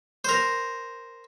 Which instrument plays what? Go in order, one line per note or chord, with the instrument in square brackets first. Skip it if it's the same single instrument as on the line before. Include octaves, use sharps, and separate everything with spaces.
[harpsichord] A#4 C5